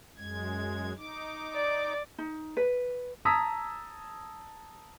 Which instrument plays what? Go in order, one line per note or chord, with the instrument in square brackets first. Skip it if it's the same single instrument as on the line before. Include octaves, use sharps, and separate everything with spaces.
[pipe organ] F#2 G#3 G#6
D#4 D6
[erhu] D5
[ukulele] D#4
B4
[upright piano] A5 A#5 D#6 E6 G#6 B6